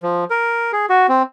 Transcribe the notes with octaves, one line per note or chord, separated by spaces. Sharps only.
F3
A#4
G#4
F#4
C4